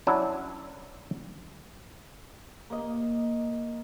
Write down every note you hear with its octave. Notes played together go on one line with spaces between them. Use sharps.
F#3 C#4 D4 E4
A#3 D#5